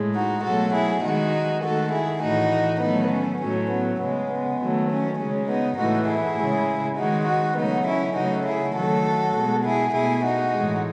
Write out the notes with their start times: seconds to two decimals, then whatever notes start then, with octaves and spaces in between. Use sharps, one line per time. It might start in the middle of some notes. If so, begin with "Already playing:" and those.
Already playing: A2 G#3
0.14 D#4 F#4
0.44 B2 F#3 A3 F#4 A4
0.73 E4 G#4
1.03 D#3 G#3 D#4 F#4
1.63 D#3 A3 F#4 A4
1.92 E4 G#4
2.22 A2 E3 A3 D#4 F#4
2.81 D#3 F#3 A3 B3 D#4
3.11 C#4
3.41 A2 F#3 A3 C#4
3.70 B3
4.01 C#3 G#3 B3
4.30 B3
4.60 D#3 F#3 A3
4.90 C#4
5.19 C#3 G#3 C#4
5.48 B3 D#4
5.78 A2 E3 A3 D#4 F#4
6.08 E4 G#4
6.38 C#3 G#3
6.97 D#3 G#3 D#4 F#4
7.27 D#4 F#4
7.57 C#3 F#3 A3 B3 D#4
7.86 C#4 E4
8.16 C#3 F#3 A3 D#4 F#4
8.46 E4 G#4
8.75 D#3 F#3 A3 F#4 A4
9.35 B2 G#3
9.64 E4 G#4
9.94 B2 A3 E4 G#4
10.24 D#4 F#4
10.53 A2 E3 G#3